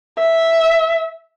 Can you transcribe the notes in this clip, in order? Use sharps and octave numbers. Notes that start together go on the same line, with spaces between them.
E5